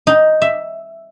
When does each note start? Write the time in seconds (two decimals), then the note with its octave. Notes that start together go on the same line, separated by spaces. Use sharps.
0.07 D#4
0.42 E5